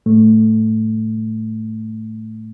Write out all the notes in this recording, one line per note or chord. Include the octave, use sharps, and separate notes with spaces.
A2 A3